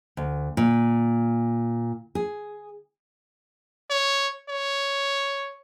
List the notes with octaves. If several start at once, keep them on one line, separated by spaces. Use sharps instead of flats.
D2
A#2
G#4
C#5
C#5